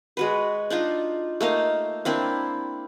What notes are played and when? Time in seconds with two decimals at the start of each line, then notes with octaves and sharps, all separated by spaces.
0.17 G#3 F#4 B4
0.70 D4 D#4 F4
1.41 A3 A#3 D#4 F5
2.05 A#3 C4 D4 E4